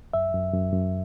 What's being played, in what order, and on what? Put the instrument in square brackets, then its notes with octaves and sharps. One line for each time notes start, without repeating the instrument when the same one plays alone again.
[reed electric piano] F#2 E5
F#2
F#2
F#2